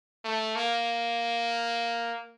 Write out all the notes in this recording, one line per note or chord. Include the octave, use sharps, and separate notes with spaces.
A3
A#3